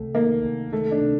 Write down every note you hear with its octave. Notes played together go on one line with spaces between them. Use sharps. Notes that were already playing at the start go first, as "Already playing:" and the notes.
Already playing: C2 A3
D#3 A#3
C2
D#3 A3
D4
C3